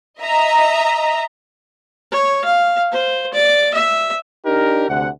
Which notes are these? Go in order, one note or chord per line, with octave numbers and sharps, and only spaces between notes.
D#5 E5 A#5
C#5
F5
C5
D5
E5
D4 D#4 G4 A#4
D2 C3 F#5